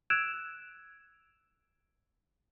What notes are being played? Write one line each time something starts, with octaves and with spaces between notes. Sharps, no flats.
E6 F#6 G#6 D7 E7 F7